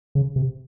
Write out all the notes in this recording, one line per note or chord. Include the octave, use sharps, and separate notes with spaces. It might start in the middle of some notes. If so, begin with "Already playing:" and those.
C#3
C3